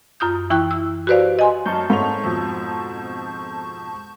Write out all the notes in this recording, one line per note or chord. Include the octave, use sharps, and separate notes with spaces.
F#2 F4 D#6 G6
E3 E4 G5 C#6 F#6
E6
F#4 G4 B4 C5 D5 F5
D#5 G#5 C6
F#2 A5 C#6 G6
G#2 A3 C#5 F7
F2 B2 F3